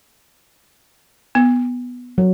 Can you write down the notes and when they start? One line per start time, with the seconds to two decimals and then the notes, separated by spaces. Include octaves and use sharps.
1.35 B3
2.18 F#3